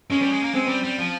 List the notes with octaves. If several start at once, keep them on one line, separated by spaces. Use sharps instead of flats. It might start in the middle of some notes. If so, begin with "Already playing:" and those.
G#3 C#4
G3
G#3
A#3
G#3 C4
G3
G3
F3